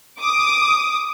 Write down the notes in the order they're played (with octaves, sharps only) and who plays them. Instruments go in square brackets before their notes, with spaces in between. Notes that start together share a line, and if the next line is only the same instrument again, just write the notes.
[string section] D6 D#6